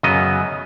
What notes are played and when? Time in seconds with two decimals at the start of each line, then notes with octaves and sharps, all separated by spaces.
0.03 F#2 C#3 F#3 B3 D#5